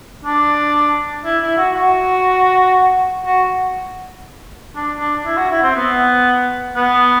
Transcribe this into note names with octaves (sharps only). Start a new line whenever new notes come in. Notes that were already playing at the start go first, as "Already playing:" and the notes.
D4
E4
E4
F#4
F#4
F#4
D4
D4
E4
F#4
E4
C4
B3
B3